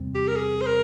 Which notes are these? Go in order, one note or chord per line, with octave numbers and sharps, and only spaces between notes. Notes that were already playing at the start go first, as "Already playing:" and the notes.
Already playing: E2 C3 G3 C4
G4
A#4
G#4
C5
A#4